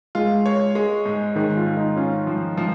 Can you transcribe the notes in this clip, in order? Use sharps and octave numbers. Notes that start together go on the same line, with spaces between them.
G#3 F4
C#5
G#3
G#2
G#2 D#3
F4
G#2
D#4
C#4 F4
F3
F3